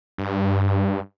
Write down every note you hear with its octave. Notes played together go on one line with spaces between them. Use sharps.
G2